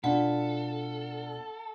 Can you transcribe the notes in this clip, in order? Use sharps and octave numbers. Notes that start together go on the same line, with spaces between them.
B2 D4 F4 A4 F#5